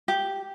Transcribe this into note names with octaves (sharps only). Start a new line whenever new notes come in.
G4